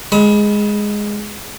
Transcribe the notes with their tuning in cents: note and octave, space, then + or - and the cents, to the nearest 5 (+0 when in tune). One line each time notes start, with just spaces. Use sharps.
G#3 +0 B5 -10 D#6 +45